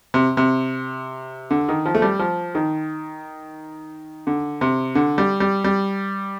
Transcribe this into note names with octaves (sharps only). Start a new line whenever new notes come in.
C3
C3
D3
D#3
F3
A3
G3
F3
D#3
D3
C3
D3
G3
G3
G3